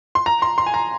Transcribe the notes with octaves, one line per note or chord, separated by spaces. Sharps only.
C6
A#5
C6
C6
G#5
A#5